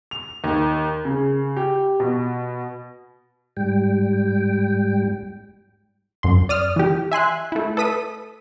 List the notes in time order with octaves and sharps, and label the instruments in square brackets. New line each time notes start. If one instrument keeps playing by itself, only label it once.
[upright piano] F7
D#2
C#3
G4
B2
[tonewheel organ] G#2 G3 G5
[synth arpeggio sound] F#2 C6
D5 D#6 F6
E3 G4
E5 G#5 C6 F#6
A3 E4
A4 B4 D#6 B6 D#7